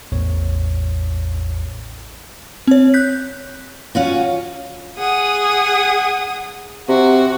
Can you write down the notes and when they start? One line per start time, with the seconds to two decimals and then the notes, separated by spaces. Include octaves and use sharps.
0.12 A1 E2 A2 C#5
2.67 C4 C#5
2.94 F#6 G6 B6
3.95 C#4 F4 F#4
4.98 G#4 F#5 D#6
6.88 C3 F#4